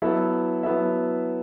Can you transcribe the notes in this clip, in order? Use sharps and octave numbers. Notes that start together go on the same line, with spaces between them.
F#3 B3 E4 A4 E5
F#3 B3 E4 A4 E5